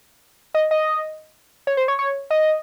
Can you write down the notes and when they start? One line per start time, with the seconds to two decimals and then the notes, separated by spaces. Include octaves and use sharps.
0.55 D#5
0.71 D#5
1.67 C#5
1.77 C5
1.88 C#5
1.99 C#5
2.31 D#5